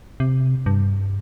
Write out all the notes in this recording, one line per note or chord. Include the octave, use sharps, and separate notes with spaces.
C3
G2